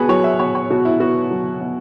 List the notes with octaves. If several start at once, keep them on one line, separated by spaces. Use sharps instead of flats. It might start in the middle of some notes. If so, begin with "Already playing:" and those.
Already playing: B2 B3 F#4 G#4 B4
F#3 C#5
E5
B2 C#5
C#5
B2 F#4
E4
B3 F#4
F#3
B2